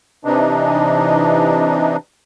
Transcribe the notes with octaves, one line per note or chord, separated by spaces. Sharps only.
C3 E3 D4 D#4